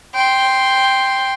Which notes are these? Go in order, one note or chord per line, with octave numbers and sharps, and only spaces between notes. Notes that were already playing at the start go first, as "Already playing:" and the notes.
G5 C6